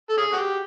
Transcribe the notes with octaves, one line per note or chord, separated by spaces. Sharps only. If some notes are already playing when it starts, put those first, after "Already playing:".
A4
C#4 G#4
F#4
G4